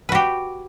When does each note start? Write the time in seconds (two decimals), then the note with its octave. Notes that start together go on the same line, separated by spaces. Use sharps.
0.09 B4
0.12 F#4
0.15 G4